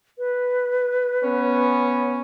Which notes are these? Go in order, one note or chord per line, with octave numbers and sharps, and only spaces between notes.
B4
B3 C#4